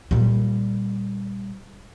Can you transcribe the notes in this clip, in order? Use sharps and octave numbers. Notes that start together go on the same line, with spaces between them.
A#2 G3